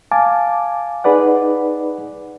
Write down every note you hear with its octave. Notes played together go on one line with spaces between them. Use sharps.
F5 G#5 A5 D6
D#4 G#4 B4 D5 F#5